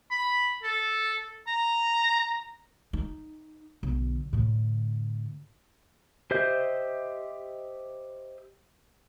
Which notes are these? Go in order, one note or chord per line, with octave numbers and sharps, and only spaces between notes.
B5
A4
A#5
D#4
B1 D3
A2 D3
G4 C5 D#5 E5 G6